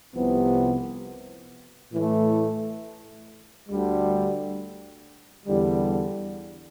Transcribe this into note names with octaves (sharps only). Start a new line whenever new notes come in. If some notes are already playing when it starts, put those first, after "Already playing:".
C2 C3 F3 B3
A2 E3 A3
D2 D3 G3
E2 D3 G3